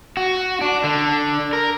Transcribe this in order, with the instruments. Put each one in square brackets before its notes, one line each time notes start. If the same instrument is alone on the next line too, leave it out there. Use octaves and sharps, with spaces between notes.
[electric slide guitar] F#4
D4
D3
A#4